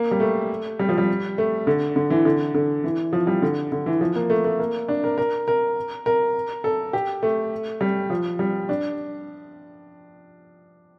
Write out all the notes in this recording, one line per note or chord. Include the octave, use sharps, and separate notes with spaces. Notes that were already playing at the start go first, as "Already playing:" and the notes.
Already playing: A#3
G3
A3
G3
F3
G3
A3
D3
D3
E3
D3
D3
E3
F3
G3
D3
D3
E3
F3
A#3
A3
A3
A#3
D4
A#4
A#4
A#4
A#4
A4
G4
A3
G3
F3
G3
D4